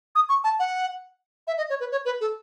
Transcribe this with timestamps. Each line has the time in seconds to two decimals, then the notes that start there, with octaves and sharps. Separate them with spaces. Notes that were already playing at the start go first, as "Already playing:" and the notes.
0.15 D#6
0.29 C#6
0.44 A5
0.59 F#5
1.47 E5
1.58 D#5
1.70 C#5
1.80 B4
1.92 C#5
2.05 B4
2.21 A4